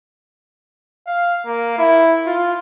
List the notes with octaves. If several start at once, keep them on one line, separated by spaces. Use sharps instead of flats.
F5
A#3
E4
F4